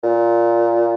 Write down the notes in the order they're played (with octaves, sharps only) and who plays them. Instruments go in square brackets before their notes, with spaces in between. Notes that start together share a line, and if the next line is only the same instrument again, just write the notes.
[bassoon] A#2